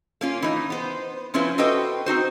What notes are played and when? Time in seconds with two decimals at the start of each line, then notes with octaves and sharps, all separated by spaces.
0.21 A#3 C#4 F4
0.42 E3 D#4
0.70 B3 C5
1.34 F3 C4 C#4 E4 F4 B4
1.58 F#4 A4 B4 C5 D#5 G5
2.06 C4 D#4 F#4 C5